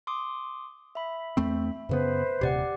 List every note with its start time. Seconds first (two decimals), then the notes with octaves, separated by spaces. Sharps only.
0.07 C6 D6 D#6
0.95 E5 B5
1.37 E2 A3 C4
1.89 F#2 C#3 B3 B4 C5
2.41 D#1 C3 G4 D5 F#5